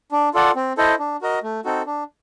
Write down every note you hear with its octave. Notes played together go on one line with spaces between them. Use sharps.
D4
F4 A4 D5 F#5
C4
E4 A4 C5 D#5
D4
F#4 A#4 D#5
A3
C4 D#4 F#4 A4
D4